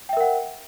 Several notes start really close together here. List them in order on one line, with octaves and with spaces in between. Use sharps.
G5 E5 A#4 F#5